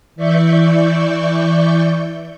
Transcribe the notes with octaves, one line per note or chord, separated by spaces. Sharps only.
E3 D5 E5 C#6 G6